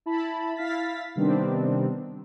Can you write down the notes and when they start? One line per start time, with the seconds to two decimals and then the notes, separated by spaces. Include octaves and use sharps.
0.06 E4 A5 B5
0.55 E4 F5 A6 B6
1.15 C3 D#3 G3 B3 C4 D4